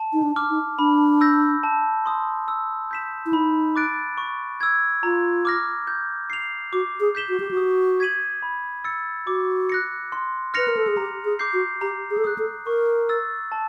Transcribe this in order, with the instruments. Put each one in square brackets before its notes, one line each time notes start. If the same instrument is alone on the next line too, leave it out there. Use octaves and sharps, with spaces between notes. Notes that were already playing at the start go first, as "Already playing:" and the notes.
Already playing: [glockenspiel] A5
[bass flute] D#4
D4
[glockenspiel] D6 F6
[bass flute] D#4
[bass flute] D4 [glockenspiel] B5
[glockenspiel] E6 G6 A#6
A5
C6 D#6
E6
G6 B6 E7
[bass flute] E4
[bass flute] D#4 [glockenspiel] B5
[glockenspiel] D6 F#6 A6 D7
C#6
E6 G#6
[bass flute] F4 [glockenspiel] A#5
[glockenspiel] D6 F6 A#6
G6
C7 F7
[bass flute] F#4 [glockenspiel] D6
[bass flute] G#4
[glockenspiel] G6 B6 E7 G7
[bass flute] F#4
G4
F#4
[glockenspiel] D#6
G#6 B6 D#7 F#7
B5
E6 A6 C#7
[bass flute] F#4 [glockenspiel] D6
[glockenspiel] F#6 A#6 C#7
C6
[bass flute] B4 [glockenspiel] F6 A#6 C#7 F7
[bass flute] A#4
A4
G#4
[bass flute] G4 [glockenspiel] A#5
[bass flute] G#4
[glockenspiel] D6 G6 C7
[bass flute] F#4
[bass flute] G4 [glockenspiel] A#5
[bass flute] G#4
A4
[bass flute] G#4 [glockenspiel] D#6 F#6
[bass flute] A4
[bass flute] A#4 [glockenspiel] C#6
[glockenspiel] E6 A6
A5